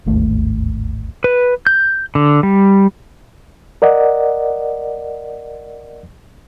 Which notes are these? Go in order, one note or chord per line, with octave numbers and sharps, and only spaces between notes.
D1 G#1 D#2 A3
B4
G6
D3
G3
A#4 D5 D#5 F#5